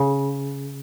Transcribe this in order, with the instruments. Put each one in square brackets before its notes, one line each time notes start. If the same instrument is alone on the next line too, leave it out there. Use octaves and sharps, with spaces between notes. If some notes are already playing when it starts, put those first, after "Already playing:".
Already playing: [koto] C#3